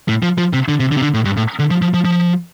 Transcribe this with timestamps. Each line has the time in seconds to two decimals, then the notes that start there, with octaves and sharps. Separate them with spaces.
0.08 A2
0.23 F3
0.38 F3
0.53 C3
0.68 D3
0.80 C3
0.92 D3
0.97 C3
1.02 D3
1.14 A2
1.25 G2
1.37 A2
1.59 D3
1.71 F3
1.82 F3
1.94 F3
2.05 F3